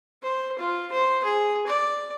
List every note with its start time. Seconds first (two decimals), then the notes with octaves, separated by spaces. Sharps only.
0.23 C5
0.58 F4
0.92 C5
1.24 G#4
1.67 D5